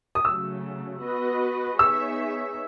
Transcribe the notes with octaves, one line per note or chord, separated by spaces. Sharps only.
D#6
C#3 F#3 A3 E6
B3 F#4 B4 D#5
B3 D#4 G#4 C#5 E5 E6